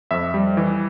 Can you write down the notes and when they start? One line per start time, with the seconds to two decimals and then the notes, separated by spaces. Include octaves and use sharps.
0.11 F2 E5
0.34 G3
0.57 E3